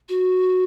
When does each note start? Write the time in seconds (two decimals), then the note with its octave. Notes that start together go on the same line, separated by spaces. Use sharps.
0.09 F#4